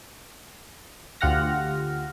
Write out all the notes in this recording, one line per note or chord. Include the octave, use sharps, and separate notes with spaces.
D2 F4 G4 F#5 F6 A#6